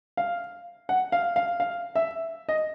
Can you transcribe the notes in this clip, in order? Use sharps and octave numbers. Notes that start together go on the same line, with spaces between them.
F5
F#5
F5
F5
F5
E5
D#5